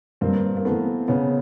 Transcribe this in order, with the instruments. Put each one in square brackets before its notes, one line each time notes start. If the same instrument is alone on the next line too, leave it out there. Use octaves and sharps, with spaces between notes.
[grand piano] G2 [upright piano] A#3 C4
[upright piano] A#3
[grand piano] E3 A3 [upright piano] B3
[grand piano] C#3 [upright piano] B3